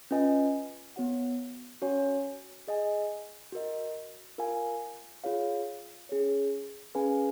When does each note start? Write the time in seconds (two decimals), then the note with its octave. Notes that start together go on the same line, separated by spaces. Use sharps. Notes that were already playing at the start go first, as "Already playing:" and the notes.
0.11 C#4 F4 B4 D#5 G#5
0.96 B3 F#4 C#5 F#5
1.82 C#4 F#4 C#5 G#5
2.68 G#4 D#5 G#5
3.52 F#4 A#4 D#5
4.38 F4 A#4 F5 G#5
5.24 F4 G#4 C#5 F5
6.09 C#4 G#4 C#5
6.95 C#4 G#4 B4 F5 G#5